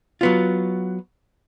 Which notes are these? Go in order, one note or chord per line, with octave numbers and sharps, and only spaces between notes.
F#3 B3 F4